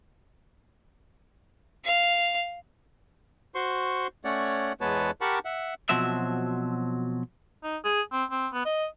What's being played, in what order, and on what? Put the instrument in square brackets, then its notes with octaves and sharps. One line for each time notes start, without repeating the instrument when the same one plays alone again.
[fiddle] F5
[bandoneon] F#4 C5 C6 C#6
A3 C#4 C#5 D5 F#5
E2 G#3 B3 B4 C#5 A5
G4 A#4 F#5 A5 B5 C#6
E5 F#5
[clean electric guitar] B2 F3 F#3 C4 E5
[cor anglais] D#4
G#4
C4
C4
B3
D#5